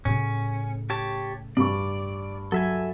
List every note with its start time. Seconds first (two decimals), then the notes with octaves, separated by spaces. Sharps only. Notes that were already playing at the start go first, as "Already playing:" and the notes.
0.05 A2 C#3 C#4
0.90 G4 C#5 A5
1.57 G2 D5 C#6
2.52 F#3 A4 E5 G#5